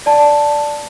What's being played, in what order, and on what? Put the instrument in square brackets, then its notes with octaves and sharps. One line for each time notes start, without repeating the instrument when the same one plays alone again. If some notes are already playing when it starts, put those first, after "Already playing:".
[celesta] D5 A5